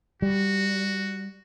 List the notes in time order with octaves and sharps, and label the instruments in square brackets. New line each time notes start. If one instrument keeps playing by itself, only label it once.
[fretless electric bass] G3 [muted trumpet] F#4